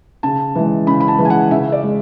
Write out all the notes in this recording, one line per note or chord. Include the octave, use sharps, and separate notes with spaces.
C#3 A5
E3 G#3
C#3 B5
B5
A5
E3 G#3
G#5
F#5
C#3 E5
D5
G#3